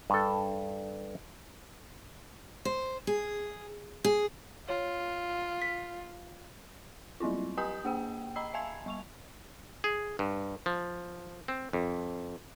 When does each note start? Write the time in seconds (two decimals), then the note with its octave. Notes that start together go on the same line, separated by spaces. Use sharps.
0.10 G2 A4
2.65 C5
3.07 G#4
4.04 G#4
4.69 F4 C#5
5.62 B6
7.20 F#3 G3 C4 E4 F4
7.58 G4 D#5 G#5 A#5 D#6 G6
7.85 A#3 G#4 G5
8.36 D#5 A#5 B5 E6 C7
8.54 E5 F5 G#5 A5 G#6
8.86 G3 C#6 F7
9.84 G#4
10.19 G2
10.66 F3
11.48 C4
11.73 F2